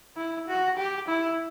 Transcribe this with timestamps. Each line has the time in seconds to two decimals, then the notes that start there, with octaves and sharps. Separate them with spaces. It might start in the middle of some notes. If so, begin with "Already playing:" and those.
0.16 E4
0.48 F#4
0.77 G4
1.08 E4